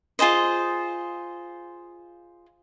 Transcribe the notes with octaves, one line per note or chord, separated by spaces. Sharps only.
F4 G#4 C5 D#5